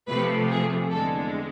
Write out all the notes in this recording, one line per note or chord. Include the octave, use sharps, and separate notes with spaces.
C3 F3 A3 B4
G#4
E2 D3 G#3 A4